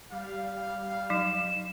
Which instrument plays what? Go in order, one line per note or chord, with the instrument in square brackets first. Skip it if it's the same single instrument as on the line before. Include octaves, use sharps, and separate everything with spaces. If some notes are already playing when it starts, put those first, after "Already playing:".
[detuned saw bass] G3 [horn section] F5
[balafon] F#3 D#4 [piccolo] E7